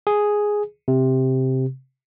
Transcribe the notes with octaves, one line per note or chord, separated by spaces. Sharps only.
G#4
C3